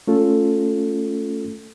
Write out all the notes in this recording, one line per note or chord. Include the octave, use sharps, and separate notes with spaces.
A3 C#4 F4 A4